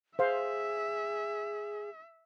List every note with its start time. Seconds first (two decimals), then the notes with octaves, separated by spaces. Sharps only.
0.19 G#4 C5 E5 F5